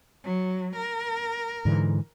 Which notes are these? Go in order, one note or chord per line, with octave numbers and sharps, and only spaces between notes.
F#3
A#4
G#2 D3 E3